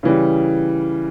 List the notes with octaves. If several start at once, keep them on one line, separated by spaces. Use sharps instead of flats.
C#3 E3 G3